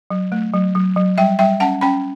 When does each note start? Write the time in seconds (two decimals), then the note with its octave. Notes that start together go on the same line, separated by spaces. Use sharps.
0.10 F#3
0.32 A3
0.53 F#3
0.75 F#3
0.96 F#3
1.18 G3 E5 G5
1.39 G3 E5 G5
1.60 C#4 F#5 A5
1.81 C#4 G5 B5